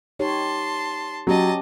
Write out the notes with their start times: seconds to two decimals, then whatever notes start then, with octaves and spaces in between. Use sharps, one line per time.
0.19 D#4 G4 C#5 A5 C6
1.27 F#3 C#4 G4 D#5 A5